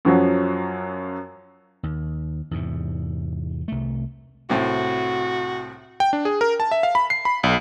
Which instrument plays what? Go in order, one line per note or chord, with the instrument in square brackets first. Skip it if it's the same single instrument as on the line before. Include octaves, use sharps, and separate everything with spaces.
[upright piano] F#2 F3 F#3
[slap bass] D#2
E2 G#2 C3
C2 A3
[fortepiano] C2 A2 C3 [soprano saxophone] F#4
[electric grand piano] G5
D4
G#4
A#4
A5
E5
F5
B5
C7
B5
B1